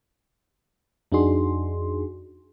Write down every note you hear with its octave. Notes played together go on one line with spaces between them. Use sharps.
F2 D4 D#4 F#4 G#4 C6